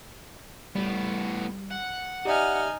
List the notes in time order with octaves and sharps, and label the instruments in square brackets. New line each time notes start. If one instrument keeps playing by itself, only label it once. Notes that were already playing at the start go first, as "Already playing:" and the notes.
[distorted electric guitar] A2 B3 [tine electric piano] G3
[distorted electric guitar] F#5
[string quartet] D#4 G#5 F6 [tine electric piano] G4 D5 E5